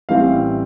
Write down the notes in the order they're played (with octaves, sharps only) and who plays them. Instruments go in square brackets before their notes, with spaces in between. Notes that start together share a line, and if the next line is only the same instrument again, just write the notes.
[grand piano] A1 A2 E3 G3 C4 F5